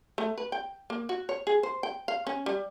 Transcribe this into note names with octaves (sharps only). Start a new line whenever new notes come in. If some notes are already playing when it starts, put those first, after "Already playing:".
A3
B4
G5
A#3
F#4
C#5
G#4
C5
G5
F5
C#4
G3